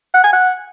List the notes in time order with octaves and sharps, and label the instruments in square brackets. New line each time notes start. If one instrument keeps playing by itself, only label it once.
[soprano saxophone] F#5
G#5
F#5